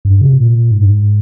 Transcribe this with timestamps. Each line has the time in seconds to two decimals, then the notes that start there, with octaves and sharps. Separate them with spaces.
0.05 G2
0.21 C#3
0.29 C3
0.38 A#2
0.71 G#2
0.81 G2
0.90 G#2